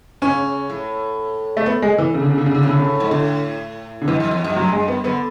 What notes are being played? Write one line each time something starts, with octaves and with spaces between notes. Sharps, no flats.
C#3 C#4
A2
A3
B3
G#3
E3
C#3
D3
C#3
D3
C#3
D3
A2 C#3
D3
C#3
G#2
A2 D3
D3
F#2 E3
F#2
E2
F#2
F#3
G#3
B3
D3 B3